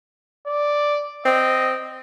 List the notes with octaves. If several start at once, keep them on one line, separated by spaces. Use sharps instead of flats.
D5
C4 D#5